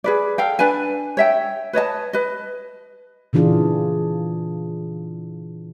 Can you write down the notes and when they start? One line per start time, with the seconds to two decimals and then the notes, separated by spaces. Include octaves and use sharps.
0.04 G#4 B4 D5
0.38 A4 F5 G5
0.59 D4 B4 D5 G#5
1.17 C#5 E5 G5
1.73 B4 C#5 D#5 A5
2.13 B4 D#5
3.33 A#2 C#3 E3 D4 F4 G#4